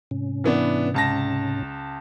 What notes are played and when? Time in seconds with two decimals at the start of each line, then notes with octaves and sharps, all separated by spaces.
0.11 G#2 C3 C#4
0.44 E3 B3 D4
0.94 C#2 A5 A#6